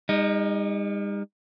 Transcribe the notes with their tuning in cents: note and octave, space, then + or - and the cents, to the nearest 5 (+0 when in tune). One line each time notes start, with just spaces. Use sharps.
G3 +45 D#4 +0